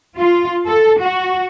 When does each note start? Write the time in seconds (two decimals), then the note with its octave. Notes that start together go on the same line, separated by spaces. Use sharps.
0.16 F4
0.65 A4
0.99 F#4